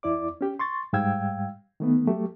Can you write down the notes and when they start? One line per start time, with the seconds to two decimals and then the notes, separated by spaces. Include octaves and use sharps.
0.03 E2 E4 D5 D6
0.41 C#4 G4
0.59 C6 C#6 A6
0.93 G#2 G3 F5 G5 E6 G#6
1.80 D#3 A3 B3
2.07 F#3 A3 G4